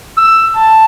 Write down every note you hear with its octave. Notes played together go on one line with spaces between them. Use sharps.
E6
A5